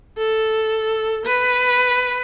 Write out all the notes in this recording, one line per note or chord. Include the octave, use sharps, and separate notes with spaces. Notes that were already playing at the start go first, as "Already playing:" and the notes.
A4
B4